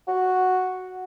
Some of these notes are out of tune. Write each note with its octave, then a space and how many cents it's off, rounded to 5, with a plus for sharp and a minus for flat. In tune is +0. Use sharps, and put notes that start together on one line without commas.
F#4 +0